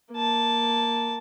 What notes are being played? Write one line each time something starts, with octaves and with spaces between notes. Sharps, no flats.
A#3 A5